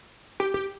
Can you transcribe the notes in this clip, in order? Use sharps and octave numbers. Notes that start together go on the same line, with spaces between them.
G4
G4